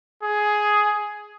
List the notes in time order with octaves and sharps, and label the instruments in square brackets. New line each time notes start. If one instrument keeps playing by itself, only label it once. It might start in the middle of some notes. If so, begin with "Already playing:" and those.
[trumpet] G#4